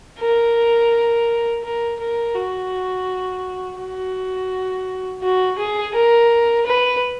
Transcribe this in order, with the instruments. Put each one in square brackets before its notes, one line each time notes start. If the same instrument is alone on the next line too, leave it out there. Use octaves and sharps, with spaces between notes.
[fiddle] A#4
A#4
A#4
F#4
F#4
F#4
G#4
A#4
B4